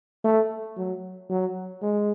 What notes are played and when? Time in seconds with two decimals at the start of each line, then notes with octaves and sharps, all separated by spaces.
0.24 A3
0.77 F#3
1.30 F#3
1.82 G#3